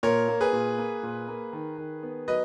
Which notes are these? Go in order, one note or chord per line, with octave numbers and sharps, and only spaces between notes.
A#2 A#4 C#5
A#3
G#4 B4
A#2
A#3
A#2
A#3
D#3
D#3
B3
F#3 B4 D#5